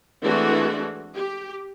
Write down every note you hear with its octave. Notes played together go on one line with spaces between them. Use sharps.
E3 G#3 A3 C4 D4 F#4
G4